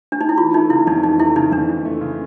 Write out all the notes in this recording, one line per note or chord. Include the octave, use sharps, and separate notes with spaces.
D4
D#4
E4
E3 F4
A3 D#4
C#3 E4
F2 D#4
E3 D#4
A3 E4
C#3 D#4
F2 D4
E3
A3
C#3